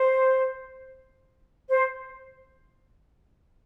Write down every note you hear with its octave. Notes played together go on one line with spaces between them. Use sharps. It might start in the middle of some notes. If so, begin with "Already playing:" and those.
Already playing: C5
C5